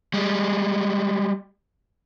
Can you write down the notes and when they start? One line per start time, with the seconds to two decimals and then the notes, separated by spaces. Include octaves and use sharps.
0.14 G3 G#3